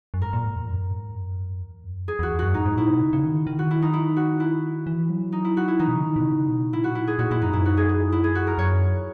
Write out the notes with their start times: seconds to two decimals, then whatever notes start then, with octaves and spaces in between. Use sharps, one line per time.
0.14 F#2
0.22 G#2 A#4
0.33 A#2
0.44 G#2
0.56 E2
0.68 F#2
0.91 G#2
1.15 F#2
1.61 E2
1.84 F#2
2.08 E2 G#4
2.19 E2 F#4
2.39 F#2 F#4
2.54 G#2 D#4
2.66 G#2
2.77 A#2 E4
2.89 B2
3.00 C#3
3.13 C#3
3.24 D#3
3.47 D#3
3.59 F#4
3.71 E4
3.82 D#4
3.93 E4
4.17 F#4
4.40 E4
4.87 E3
5.10 F#3
5.32 D#4
5.45 E4
5.57 F#4
5.68 E4
5.79 E3 D#4
5.88 B2
5.96 C#3
6.03 D#3
6.16 B2
6.26 C#3
6.49 B2
6.73 A#2 E4
6.84 F#4
6.95 E4
7.07 G#4
7.19 A#2 F#4
7.31 A#2 E4
7.42 F#2 D#4
7.53 F#2 E4
7.66 F#4
7.77 G#4
7.89 G#4
8.12 E4
8.24 G#4
8.35 F#4
8.47 A#4
8.58 F#2 C#5